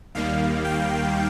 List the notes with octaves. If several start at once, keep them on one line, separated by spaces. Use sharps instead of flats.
D#2 D#3 G3 A#3 F5
G5